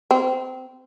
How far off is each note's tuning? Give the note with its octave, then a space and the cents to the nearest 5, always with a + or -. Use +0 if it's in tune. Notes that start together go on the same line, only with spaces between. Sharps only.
C4 -20